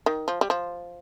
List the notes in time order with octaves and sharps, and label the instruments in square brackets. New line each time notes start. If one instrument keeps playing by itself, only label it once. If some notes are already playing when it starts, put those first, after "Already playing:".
[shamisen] D#3
F3
G3
F3